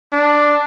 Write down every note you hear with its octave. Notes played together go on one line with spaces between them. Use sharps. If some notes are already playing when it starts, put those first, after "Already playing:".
D4